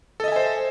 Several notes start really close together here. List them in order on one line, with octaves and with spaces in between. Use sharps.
A4 D#5 E5 G#5 C5